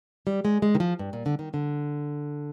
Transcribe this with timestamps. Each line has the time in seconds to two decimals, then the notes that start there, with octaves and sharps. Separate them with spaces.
0.27 G3
0.45 G#3
0.62 G#3
0.75 D#3
0.80 F3
0.99 G2
1.13 A#2
1.26 D3
1.39 D#3
1.54 D3